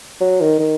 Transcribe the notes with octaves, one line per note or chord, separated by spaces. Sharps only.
F#3
D#3
D#3